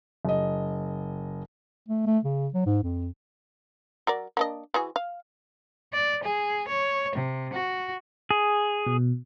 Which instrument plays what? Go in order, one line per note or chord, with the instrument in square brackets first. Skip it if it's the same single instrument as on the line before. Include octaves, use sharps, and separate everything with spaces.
[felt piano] F#1 D#5
[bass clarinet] A3
A3
C#3
F#3
G#2
F2
[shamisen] F#3 A#4 D5
A#3 D4 D#5
E3 F#4 G#4
F5
[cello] D5
G#4
C#5
C3
F#4
[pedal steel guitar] G#4
[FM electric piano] B2